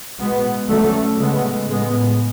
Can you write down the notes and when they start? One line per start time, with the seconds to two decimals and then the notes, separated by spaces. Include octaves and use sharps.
0.19 B2 G#3 B3
0.68 D3 F#3 A3 C#4
1.18 C#3 G#3 B3
1.68 A2 G#3 B3